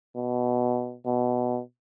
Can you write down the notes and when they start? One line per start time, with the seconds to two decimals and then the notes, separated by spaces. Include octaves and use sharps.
0.16 B2
1.05 B2